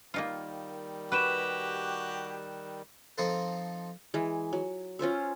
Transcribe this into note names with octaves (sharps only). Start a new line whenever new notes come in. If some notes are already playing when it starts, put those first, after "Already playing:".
D#3 G3 A#3 D#4 F4
F#4 G4 B4 G5 F#6 E7
F3 C4 D#4 F4 A4
E3 G#3
F#3
C#4 F4 C5 E5